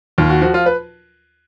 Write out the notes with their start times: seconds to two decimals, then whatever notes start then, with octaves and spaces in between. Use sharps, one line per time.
0.18 D#2 F4
0.30 F#4
0.42 F3 F#4
0.54 F4
0.66 B4